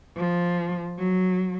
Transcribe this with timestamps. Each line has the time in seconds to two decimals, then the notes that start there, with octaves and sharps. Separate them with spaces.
0.17 F3
0.99 F#3